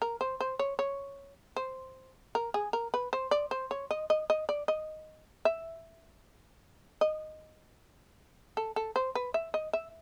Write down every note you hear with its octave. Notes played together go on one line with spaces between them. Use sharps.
A#4
C5
C5
C#5
C#5
C5
A#4
G#4
A#4
B4
C5
D5
C5
C#5
D#5
D#5
D#5
D5
D#5
E5
D#5
A4
A4
C5
B4
E5
D#5
E5